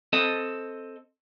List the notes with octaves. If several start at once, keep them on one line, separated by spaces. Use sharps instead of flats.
C4 A4 D#5